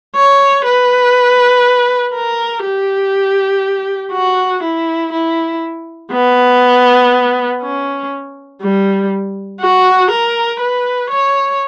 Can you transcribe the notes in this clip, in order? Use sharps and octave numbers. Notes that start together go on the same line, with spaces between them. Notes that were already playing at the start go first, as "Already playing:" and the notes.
C#5
B4
A#4
G4
F#4
E4
E4
B3
C#4
G3
F#4
A#4
B4
C#5